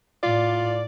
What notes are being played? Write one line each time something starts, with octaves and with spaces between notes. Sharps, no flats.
A2 F4 D5